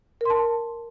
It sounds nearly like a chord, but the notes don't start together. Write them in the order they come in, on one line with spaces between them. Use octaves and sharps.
A#4 C6 A5